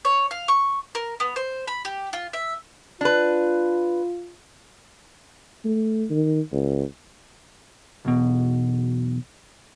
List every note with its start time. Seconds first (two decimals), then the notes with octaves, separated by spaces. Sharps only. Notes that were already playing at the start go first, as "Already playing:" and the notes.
0.05 C#5
0.31 F5
0.48 C#6
0.95 A#4
1.20 B3
1.36 C5
1.67 B5
1.85 G4
2.13 F4
2.33 E5
3.01 D4 F4 B4
5.65 A3
6.10 D#3
6.52 C#2
8.05 B1 E2 B2